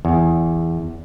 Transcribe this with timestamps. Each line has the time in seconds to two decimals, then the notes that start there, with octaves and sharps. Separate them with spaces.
0.05 E2